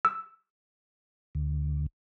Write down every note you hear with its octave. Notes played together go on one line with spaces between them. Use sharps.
E6
D2